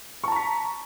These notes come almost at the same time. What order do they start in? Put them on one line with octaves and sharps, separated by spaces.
C#6 A5 A#5 B6